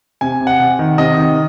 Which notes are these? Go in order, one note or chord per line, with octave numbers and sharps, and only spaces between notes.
C3 G#5
C3
F#5
C3
D#3
C3 D#5
D#3